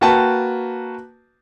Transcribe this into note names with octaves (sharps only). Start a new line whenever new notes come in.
A#3 F#4 B4 G5 A5